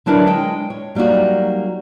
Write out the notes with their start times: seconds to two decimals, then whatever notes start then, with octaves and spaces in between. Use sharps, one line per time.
0.06 D3 F#3 D4 E4 A#4 B4
0.27 G#3 G5
0.70 C#5
0.95 F#3 G3 A#3 D#4 F#4